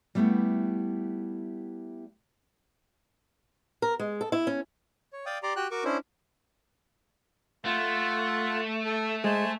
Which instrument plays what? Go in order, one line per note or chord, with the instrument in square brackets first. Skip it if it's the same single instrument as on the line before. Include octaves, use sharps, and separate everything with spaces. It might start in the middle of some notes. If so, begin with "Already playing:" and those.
[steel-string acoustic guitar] G3 A3 B3 E4 G4
A#4
G#3
A4
E4
C#4
[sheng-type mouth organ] C#5
D5 F5 G5 D#6
G4 D5 A#5 C6 D6
F#4 G4 G5 F#6
F#4 A#4 C#6 D6
C#4 D4 E4 C5
[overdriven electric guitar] A3 [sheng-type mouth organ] F4 F#5
[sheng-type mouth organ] A4
[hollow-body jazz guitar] G#3 [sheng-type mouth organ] C5 G#5 A5